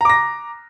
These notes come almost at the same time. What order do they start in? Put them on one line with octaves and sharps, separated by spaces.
A#5 D6 A#6